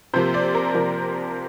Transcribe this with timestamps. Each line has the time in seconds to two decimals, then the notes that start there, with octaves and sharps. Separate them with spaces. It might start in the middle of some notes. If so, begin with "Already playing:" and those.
0.13 C3 F3 A#3 C5
0.34 D5
0.55 A#4
0.74 C3 F3 A#3